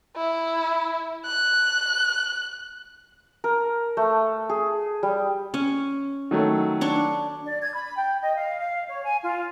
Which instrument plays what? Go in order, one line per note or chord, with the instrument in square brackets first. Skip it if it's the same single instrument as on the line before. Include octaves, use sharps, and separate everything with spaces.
[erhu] E4
F#6
[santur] A#4
A3
G#4
G3
[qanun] C#4
[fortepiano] D#3 F#3 A3
[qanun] D4 C#5
[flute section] D5
G#6
B5
G5
D#5
F5
F5
C#5
G#5
F4